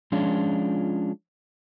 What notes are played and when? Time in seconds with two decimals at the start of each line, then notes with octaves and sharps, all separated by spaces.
0.12 F3 G#3 C#4 D4 F4